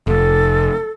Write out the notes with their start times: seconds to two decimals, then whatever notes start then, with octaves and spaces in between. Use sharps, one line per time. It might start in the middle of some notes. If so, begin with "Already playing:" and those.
0.07 F1 A4